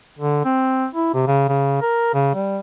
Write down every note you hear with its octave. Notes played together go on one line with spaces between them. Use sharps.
D3
C4
E4
C3
C#3
C#3
A#4
C#3
G3